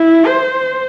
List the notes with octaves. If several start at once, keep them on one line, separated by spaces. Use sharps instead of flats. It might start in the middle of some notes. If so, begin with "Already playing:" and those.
Already playing: E4
C5